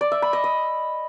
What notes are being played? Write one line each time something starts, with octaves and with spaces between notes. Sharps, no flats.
D5
E5
B5
D#5
D#5